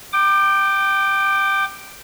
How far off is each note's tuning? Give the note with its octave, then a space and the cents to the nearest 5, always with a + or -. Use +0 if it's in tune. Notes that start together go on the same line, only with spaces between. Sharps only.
G5 -10 D6 +25